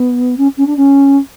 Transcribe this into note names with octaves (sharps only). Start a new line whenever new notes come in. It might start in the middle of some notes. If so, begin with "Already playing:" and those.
Already playing: B3
C#4
C#4
D4
C#4